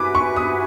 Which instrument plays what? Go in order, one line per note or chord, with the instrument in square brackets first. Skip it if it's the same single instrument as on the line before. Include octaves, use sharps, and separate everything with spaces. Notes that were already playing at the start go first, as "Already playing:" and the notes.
Already playing: [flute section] F#4 B4 E5 G#5 [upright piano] D6
[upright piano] C#6
D#6